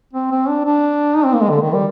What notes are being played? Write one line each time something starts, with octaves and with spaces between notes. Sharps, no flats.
C4
C4
D4
D4
D#4
C4
A#3
G#3
D3
D#3
G3